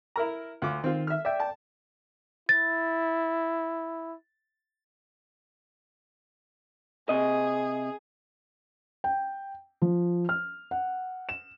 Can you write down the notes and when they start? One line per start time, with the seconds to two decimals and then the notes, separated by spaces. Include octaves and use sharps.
0.16 E4 A#4 A#5
0.62 D2 F4 D6
0.84 D#3 C4 F4
1.07 E5 F6
1.25 D5 E5 G5
1.40 A5
2.49 E4 A6
7.09 C3 G#4 D#5
9.04 G5
9.82 F3
10.29 F6
10.71 F#5
11.29 E7